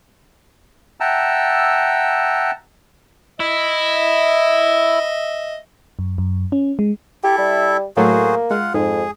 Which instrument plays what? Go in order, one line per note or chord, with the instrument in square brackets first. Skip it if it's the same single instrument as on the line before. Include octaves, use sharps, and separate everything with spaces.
[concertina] E5 F#5 G5 A5 A#5 E6
[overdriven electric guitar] E4 [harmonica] D#5 E5
[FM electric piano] F#2
F#2
C#4
G#3
[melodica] E4 A4 E5 [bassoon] G4
[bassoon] G3
[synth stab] A2 F#3 A3 [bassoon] A#3 [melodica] F#4 G#4 C5
[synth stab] G#3 [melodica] F4 F#5
[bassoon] F2 [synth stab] G#2 [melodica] G#4